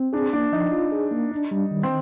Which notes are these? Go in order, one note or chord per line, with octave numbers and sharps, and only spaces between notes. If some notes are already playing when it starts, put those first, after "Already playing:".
Already playing: C4
D4 G#4
A#3 D4
F3 D#4
F4
G#4
A#3
D4
G3
D#3
C4